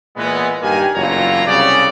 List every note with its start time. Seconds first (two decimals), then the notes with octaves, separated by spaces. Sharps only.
0.17 A#2 E3 G#3 B3
0.62 G2 D#3 A#3 G4 G#5
0.94 F#1 E2 G2 F4 C#5 A#5
1.46 C2 C#3 D5